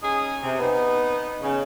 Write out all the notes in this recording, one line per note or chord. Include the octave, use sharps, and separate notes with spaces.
C#4 D#4 G#4
C3
B3 D#4
C#3